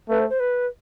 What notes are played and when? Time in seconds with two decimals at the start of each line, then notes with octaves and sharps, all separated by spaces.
0.09 A3 B4
0.19 C5
0.30 C5
0.39 B4